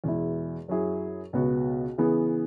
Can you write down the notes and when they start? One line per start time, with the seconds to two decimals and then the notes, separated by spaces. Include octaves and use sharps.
0.04 E2 B2 G#3 E4
0.68 F#2 F#3 E4 G#4
1.33 C#2 B2 B3 F#4
1.98 C#3 E3 B3 G#4